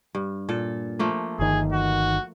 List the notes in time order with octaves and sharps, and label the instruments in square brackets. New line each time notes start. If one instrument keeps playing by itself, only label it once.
[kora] G2
A#2 A4
F3 A3 A#3
[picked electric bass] G1 D#3 [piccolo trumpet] G#4
[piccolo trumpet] F#4